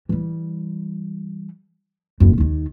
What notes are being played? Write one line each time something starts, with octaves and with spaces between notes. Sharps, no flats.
E3 G3
D#1 F#2
D#2 D#3